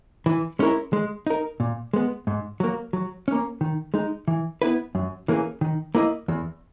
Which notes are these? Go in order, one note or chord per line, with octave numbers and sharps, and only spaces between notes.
E3
G#3 C#4 E4 A#4
G#3
D#4 A#4
A#2
G#3 B3
G#2
F#3 A#3
F#3
A#3 C#4
D#3
G#3 D#4
E3
B3 E4 B4
F#2
E3 A#3 C#4 G#4
D#3
A#3 E4 B4 D#5
E2